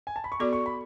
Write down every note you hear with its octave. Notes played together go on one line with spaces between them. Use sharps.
G#5
A5
B5
C#6
B3 F#4 A4 D5 D6
C#6
B5